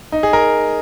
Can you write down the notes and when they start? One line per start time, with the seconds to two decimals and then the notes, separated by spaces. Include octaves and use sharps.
0.12 D#4
0.23 G#4
0.33 A#4